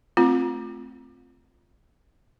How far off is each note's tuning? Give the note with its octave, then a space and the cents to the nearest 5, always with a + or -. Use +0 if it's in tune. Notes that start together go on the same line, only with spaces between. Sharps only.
A3 +0 C4 +0 F4 +0